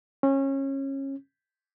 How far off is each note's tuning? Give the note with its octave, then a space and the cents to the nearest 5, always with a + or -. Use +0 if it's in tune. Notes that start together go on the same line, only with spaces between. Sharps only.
C#4 -25